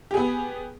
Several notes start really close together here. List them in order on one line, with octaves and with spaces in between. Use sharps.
G4 G#4 B3